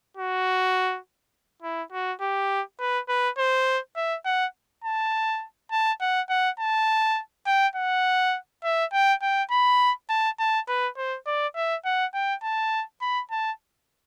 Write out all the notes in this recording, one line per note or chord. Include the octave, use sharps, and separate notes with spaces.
F#4
E4
F#4
G4
B4
B4
C5
E5
F#5
A5
A5
F#5
F#5
A5
G5
F#5
E5
G5
G5
B5
A5
A5
B4
C5
D5
E5
F#5
G5
A5
B5
A5